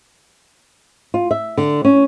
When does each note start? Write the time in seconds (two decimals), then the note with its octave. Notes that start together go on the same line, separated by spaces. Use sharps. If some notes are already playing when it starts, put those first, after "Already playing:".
1.14 F4
1.31 E5
1.57 D3
1.85 C#4